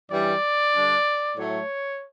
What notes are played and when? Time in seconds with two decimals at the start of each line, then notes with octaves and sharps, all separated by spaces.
0.11 G2 E3 G3 C#4 D5
0.74 D3 G3 D4
1.38 A2 F#3 A3 C#5